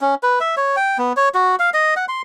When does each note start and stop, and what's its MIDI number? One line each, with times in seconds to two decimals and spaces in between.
0.01 0.15 61
0.23 0.39 71
0.40 0.55 76
0.57 0.76 73
0.76 0.98 79
0.98 1.13 59
1.17 1.29 73
1.34 1.56 66
1.59 1.70 77
1.74 1.94 75
1.96 2.05 78
2.08 2.22 84